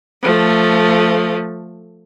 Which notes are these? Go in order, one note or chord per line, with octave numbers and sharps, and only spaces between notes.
F3 A3